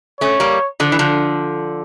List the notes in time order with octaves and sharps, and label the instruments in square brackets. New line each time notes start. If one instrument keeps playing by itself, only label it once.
[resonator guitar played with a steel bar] A3 C#4 [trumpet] C#5
[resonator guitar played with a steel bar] G3 A#3
D3 F3
E3
D3 F3